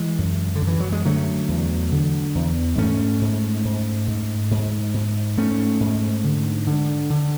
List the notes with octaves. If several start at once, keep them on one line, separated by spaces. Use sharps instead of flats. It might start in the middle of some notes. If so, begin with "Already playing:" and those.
Already playing: E3 G#3
F#2
D3
F#2
E3
F#3
G#3
D3 F#3 A3
E2
D3
E2
G#2 A3 C#4
G#2
G#2
G#2
G#2
G#2
G#2 A3 C#4
G#2
D3
D3
D3